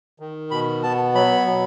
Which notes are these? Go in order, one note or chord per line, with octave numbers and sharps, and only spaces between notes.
D#3
B2 B5
B3 A5
F#3 B5
B2